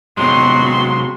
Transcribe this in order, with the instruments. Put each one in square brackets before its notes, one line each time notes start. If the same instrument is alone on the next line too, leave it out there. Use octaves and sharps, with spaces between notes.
[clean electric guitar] C3 F#3 G#3 [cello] B3 F#4 [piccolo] C6